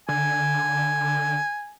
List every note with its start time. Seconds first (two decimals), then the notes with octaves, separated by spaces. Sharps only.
0.09 D3 G#5